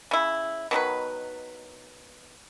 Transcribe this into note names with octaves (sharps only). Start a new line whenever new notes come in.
C#3 E4
B2 D#3 F#3 B4